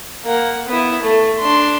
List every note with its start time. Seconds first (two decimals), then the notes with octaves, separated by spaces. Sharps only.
0.25 A#3 F#5
0.68 B3 E4
1.03 A3
1.39 D4 C6